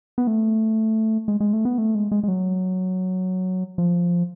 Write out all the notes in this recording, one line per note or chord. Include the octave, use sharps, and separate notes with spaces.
B3
A3
G#3
G#3
A3
B3
A3
G#3
G#3
G#3
F#3
F3